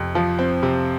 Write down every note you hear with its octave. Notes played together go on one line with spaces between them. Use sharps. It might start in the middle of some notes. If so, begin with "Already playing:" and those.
Already playing: F2 C3
F3
C4
C3